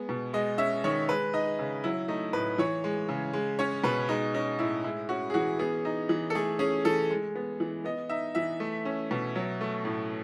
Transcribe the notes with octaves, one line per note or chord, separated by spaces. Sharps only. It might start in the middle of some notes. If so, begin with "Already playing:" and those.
Already playing: G#3 B3
B2
G#3 D#5
C#4 E5
D#3 C#5
G#3 B4
D#4 D#5
C#3
F#3 E4
A3 D#4
A2 B4
E3 C#5
G#3
C#3
G#3
C#4 C#5
B2 B4
G#3 D#4
C#4 D#4
A2 E4
G#3 E4
C#4 F#4
G#4
E3 F#4
B3 G#4
D#4
E3
A4
A3 G#4
C#4 G#4
E3 A4
G#3
B3
E3
B3 D#5
D#4 E5
E3 E5
A3
C#4
B2
F#3
A3
A2